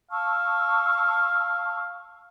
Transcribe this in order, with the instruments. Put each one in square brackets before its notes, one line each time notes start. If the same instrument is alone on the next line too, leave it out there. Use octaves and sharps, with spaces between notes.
[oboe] F5 [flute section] A5 C#6 E6